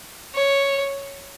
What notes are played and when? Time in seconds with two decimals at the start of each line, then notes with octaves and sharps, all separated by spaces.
0.34 C#5